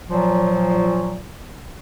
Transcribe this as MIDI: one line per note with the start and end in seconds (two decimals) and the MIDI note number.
0.10 1.21 46
0.10 1.21 53
0.10 1.21 54